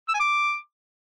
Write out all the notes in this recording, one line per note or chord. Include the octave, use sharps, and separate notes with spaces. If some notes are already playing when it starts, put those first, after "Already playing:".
E6
G#5
D6